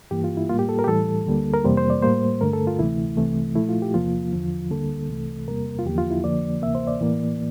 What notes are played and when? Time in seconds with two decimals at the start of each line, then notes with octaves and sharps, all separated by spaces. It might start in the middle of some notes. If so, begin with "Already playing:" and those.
0.11 G2 E3 A#3 G4
0.24 F4
0.37 E4
0.49 A2 G3 A#3 F4
0.59 G4
0.69 A4
0.79 A#4
0.84 G4
0.87 A2 E3 G3 A4
1.26 D2 D3 G3 A#3
1.54 A#4
1.65 F2 C3 E3 G3 A#3 C5
1.77 C5
1.90 D5
2.02 A2 G3 A#3 C5
2.41 G2 D3 A3 A#4
2.53 A4
2.67 F4
2.79 D2 C3 E3 A3 E4
3.17 C2 C3 E3 A3
3.56 A#2 F3 A3 E4
3.69 F4
3.82 G4
3.94 E2 C3 F3 A#3 F4
4.33 E2 D3 F3
4.71 D2 D3 G3 A#3 A4
5.09 C2 C3 E3 A3
5.47 E2 C3 G3 A#3 A#4
5.79 F4
5.86 E2 D3 F3 A#3 G4
5.98 F4
6.11 E4
6.24 F2 D3 F3 A#3 D5
6.62 D2 C3 E3 A#3 E5
6.75 C5
6.87 D5
7.01 A2 E3 A#3